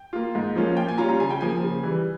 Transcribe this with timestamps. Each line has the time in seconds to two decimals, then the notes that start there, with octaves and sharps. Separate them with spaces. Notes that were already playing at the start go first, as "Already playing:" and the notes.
Already playing: G5
0.13 A#3 F4
0.35 G#2
0.55 F3 A#3 C#4 F4
0.77 A#2 G5
0.88 G#5
0.98 G3 C#4 F4 A#5
1.09 A#5
1.20 C#3 G#5
1.30 G5
1.41 F3 A#3 G#5
1.63 C#3
1.83 E3 G3